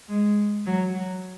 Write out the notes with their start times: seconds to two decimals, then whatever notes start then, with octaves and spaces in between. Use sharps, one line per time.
0.09 G#3
0.66 F#3
0.95 F#3